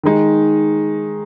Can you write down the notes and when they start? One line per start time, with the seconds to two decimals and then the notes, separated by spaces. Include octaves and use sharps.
0.03 D#3 G#3 D#4